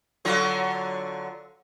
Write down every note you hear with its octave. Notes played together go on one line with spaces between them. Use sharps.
D3 F#3 F4